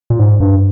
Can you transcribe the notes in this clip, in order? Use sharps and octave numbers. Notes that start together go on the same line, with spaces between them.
A#2
G#2
G2